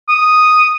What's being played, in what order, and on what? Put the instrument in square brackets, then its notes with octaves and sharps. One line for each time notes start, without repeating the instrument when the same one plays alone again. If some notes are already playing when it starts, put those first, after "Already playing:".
[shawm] D#6